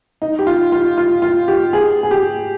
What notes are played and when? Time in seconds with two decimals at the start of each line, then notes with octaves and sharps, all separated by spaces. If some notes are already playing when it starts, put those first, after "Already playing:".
0.22 D#4
0.39 G4
0.47 F4
0.72 F4
0.98 F4
1.22 F4
1.48 G4
1.73 G#4
2.03 G#4
2.11 G4